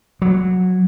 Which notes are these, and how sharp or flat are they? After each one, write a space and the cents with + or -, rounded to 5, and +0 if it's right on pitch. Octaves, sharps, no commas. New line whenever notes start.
F#3 -10